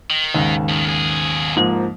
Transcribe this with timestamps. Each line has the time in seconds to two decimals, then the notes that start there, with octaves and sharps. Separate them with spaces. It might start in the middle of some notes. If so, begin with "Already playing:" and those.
0.10 D#3
0.35 D#2 G#2 C#3
0.69 D2 D#3
0.85 B1 G#4
1.56 G#2 F3 A#3